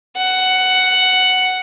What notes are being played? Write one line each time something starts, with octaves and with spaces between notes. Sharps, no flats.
F#5